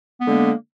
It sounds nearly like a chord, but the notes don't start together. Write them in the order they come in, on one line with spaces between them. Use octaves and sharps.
B3 G#3 D3 A#3